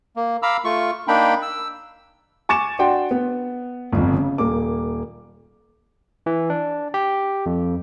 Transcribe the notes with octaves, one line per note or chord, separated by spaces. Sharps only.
A#3
F5 A#5 B5 D6 E6
A3 F4 C#6
A#3 D4 D#4 G5 B5
E6
G#5 C#6 D6 A6 C#7 E7
D4 F#4 F#5 G5 C6
B3
G1 F2
C#3
D#1 A#3 D6
E3
D4
G4
F2